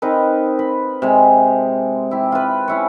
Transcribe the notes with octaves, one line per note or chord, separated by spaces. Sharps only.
C4 D#4 A#4 B4
B4
C3 G#3
E4 G4
F4 B4
C#4 E4 C#5